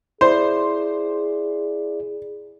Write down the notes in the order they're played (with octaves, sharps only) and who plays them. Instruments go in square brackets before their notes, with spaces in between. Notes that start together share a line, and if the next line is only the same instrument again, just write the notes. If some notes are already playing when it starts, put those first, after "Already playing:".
[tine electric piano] E4 D5 [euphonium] G#4 [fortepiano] C5